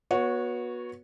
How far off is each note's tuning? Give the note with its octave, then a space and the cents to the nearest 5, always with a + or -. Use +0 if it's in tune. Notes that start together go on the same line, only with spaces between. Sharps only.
B3 -25 F#4 -20 C#5 +0